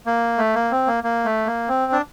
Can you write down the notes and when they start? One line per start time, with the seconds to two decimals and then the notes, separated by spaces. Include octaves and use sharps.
0.06 A#3
0.38 A3
0.55 A#3
0.71 C4
0.87 A#3
1.04 A#3
1.25 A3
1.46 A#3
1.69 C4
1.92 D4